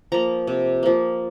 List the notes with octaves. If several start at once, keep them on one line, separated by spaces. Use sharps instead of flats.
F3 A#3 A#5
C3
F3 A#3